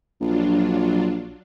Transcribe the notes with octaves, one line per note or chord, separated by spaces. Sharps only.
A#1 F#3 D4 F4